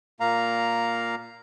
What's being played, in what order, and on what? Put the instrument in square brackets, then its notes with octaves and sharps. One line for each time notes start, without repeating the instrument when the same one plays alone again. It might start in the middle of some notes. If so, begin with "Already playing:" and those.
[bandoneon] A#2 A#3 F5 A#5